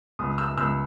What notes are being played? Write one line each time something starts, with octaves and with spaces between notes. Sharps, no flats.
C#2 D#6
E6
C#2 E6